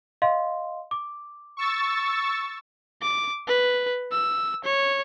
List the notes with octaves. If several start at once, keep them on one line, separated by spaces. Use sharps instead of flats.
D#5 F5 C6
D6
C#6 E6 A6
D6
B4
E6
C#5